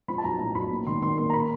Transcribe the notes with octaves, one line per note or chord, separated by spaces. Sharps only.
F3 B5
A5
B1 A#5
A2 A#5
B1 B5
A#3
D#3 C6
D#3 C6
A#3 C6
A#5
B5